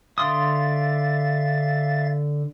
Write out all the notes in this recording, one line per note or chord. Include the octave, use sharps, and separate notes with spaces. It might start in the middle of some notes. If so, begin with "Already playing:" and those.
D3 E5 F5 C6 D#6 A6